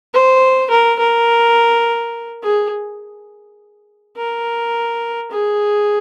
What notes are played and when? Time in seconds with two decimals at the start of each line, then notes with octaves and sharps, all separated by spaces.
0.14 C5
0.70 A#4
0.99 A#4
2.43 G#4
4.16 A#4
5.31 G#4